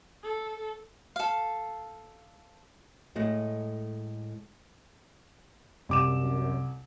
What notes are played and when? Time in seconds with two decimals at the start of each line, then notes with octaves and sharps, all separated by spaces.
0.23 A4
1.16 A4 F5
3.15 A2 G#3 A3 D#5
5.89 C2 F#2 D6 E7